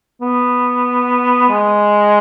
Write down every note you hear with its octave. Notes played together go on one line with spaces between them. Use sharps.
B3
G#3